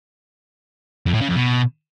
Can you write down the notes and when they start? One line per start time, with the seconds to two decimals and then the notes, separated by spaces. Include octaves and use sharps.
1.06 F2
1.14 A2
1.21 C#3
1.28 F2
1.36 B2